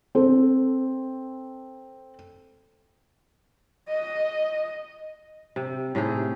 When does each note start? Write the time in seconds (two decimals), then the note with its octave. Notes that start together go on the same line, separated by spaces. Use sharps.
0.15 C4 A4 C5
3.89 D#5
5.56 C3
5.95 A2 C3 D#4 G#4